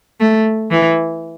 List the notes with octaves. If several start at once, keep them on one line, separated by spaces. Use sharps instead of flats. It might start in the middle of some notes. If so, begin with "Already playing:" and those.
A3
E3